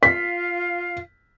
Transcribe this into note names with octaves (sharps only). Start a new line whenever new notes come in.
F4 F5 B6